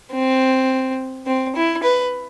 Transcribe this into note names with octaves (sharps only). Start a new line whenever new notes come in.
C4
C4
E4
B4